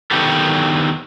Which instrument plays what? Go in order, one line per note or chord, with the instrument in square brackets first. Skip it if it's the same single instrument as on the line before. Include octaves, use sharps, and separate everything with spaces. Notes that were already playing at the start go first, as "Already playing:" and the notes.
[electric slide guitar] D3 D#3 B3 F#4 G4 A4